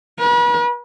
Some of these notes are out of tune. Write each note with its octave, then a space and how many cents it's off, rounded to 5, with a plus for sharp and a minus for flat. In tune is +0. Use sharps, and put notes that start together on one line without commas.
B4 -40